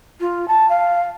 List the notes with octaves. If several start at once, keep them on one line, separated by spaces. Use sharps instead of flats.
F4
A5
F5